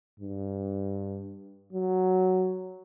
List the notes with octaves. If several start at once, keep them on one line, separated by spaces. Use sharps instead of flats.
G2
F#3